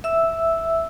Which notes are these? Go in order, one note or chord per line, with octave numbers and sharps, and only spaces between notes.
E5 E6